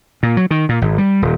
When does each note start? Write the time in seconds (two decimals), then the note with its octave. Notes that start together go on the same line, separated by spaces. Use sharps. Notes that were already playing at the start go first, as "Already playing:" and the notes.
0.23 A#2
0.37 F#3
0.51 D#3
0.69 A#2
0.81 G#1
0.98 G3
1.22 D#1